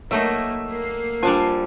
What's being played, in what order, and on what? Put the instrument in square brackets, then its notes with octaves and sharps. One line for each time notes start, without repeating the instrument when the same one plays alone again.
[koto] F#3 A3 D#4 [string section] A#3 [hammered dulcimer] E5
[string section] A#3 C7
[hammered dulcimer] F3 [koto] G3 D4 G#5